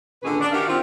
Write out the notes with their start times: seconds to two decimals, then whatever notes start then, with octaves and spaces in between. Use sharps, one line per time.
0.23 A#2 D3 D#3 C#4 G#4 B4
0.40 D4
0.51 D#3 F#4 G4 A#4 E5 F5
0.68 C4 F4